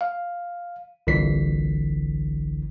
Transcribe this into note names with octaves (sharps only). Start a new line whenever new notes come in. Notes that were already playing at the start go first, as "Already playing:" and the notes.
F5
G1 C2 D3 E3 B6 C7